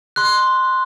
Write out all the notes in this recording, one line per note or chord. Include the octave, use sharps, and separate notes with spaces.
C6 F#6